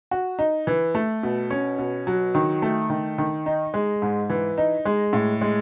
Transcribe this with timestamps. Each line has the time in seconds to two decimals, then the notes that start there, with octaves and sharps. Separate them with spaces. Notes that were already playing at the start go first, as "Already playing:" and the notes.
0.11 F#4
0.39 D#4
0.67 E3
0.95 A3
1.23 B2
1.50 C#4
1.78 B2
2.07 F#3
2.35 D#3
2.62 A3
2.90 D#3
3.18 D#3
3.46 D#4
3.74 G#3
4.02 G#2
4.30 E3
4.58 D#4
4.85 G#3
5.13 A2
5.41 G#3